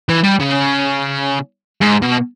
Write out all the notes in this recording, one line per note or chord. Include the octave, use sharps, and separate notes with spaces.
E3
G3
C#3
G#2
B2